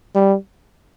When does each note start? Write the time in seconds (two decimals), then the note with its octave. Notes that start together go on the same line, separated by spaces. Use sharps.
0.15 G3